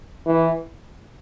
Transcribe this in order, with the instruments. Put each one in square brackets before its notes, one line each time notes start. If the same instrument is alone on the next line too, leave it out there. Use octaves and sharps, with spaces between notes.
[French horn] E3